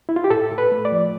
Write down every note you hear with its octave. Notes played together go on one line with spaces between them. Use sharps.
E4
F4
G4
A2 A4
A2
B4
A3
D5
F3